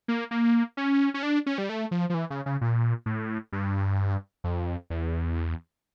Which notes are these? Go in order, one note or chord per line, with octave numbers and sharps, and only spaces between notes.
A#3
A#3
C#4
C#4
D4
C#4
G3
A3
F3
F3
E3
C#3
C#3
A#2
A2
G2
F2
E2